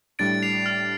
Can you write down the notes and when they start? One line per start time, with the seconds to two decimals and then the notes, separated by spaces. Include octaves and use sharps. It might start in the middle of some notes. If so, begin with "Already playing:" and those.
0.19 A2 G3 D4 A6 D7
0.43 C7 F7
0.66 F6